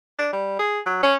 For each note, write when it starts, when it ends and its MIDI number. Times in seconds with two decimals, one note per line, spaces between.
0.19 0.32 62
0.33 0.58 55
0.59 0.80 68
0.86 1.01 54
1.03 1.16 61